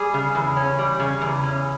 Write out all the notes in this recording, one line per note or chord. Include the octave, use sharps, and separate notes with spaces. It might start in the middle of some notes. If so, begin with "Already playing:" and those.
Already playing: G3 G#4
C#3
E2
C#4
G3
C#3
E2
C#4